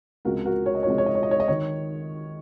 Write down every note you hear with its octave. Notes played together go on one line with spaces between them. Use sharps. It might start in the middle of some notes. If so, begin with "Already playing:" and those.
C#2 C3 F3 G#3 F#4 A#4
F#4 A#4
C#5
D#5
C#5
C#2 C3 F3 G#3 D#5
C#5
D#5
C#5
D#5
C#5
D#5
D#3 C#5